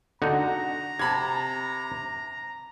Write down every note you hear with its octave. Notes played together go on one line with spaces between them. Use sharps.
D3 D#4 F#4 F#5 A#5
C3 A5 B5 G#6